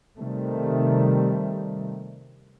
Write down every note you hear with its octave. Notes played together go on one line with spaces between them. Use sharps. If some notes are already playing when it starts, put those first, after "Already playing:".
C3 D#3 G3 A3